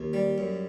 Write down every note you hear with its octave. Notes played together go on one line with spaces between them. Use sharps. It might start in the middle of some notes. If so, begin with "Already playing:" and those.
Already playing: D#2
G3
F#2